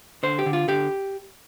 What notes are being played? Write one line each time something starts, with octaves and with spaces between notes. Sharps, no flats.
D3 C5
G4
D3
F4
D3 G4